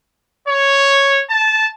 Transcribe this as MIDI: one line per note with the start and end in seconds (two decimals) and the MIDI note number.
0.47 1.21 73
1.30 1.67 81